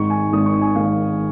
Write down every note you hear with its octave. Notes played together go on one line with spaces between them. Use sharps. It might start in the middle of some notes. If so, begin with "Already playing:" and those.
Already playing: G#1 G#2 D#3 C#6
G#5
G#1 G#2 D#3 D#6
C#6
G#5
G#1 G#2 D#3 F5